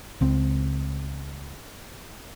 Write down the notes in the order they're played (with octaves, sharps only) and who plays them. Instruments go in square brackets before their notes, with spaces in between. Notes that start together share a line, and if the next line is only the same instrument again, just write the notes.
[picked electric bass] C#2 C4